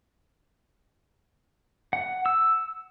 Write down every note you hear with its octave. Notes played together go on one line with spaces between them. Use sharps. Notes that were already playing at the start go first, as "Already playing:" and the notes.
F#5
E6